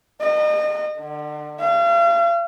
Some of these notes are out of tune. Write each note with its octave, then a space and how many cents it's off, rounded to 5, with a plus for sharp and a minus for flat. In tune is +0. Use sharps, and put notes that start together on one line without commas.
D#5 -35
D3 +30
F5 -40